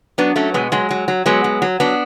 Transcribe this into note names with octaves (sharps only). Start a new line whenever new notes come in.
F#3 B3 D4
F#3 A3 C#4
B2 G#3 B3
F#3 G#3
F#3
F#3
F#3 G#3 B3
F#3
F#3
F#3 B3 D4